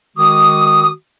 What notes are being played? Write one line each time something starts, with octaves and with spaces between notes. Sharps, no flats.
D#3 G#3 F#4 D6 D#6